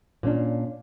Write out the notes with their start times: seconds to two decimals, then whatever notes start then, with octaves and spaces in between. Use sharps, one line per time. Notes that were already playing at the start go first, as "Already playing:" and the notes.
0.23 A#2 C#4 D4